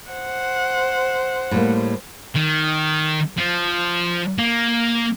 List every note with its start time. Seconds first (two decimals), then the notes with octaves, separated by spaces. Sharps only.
0.12 C5 F#5
1.51 A2 G3 A#3
2.35 D#3
3.38 F3
4.38 A#3